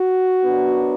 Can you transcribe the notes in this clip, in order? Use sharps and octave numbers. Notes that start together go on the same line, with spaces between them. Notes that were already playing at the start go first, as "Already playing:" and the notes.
Already playing: F#4
F#2 F#3 B3 D4